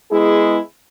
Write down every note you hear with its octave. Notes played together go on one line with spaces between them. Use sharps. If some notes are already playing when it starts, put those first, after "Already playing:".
G#3 B3 E4 G#4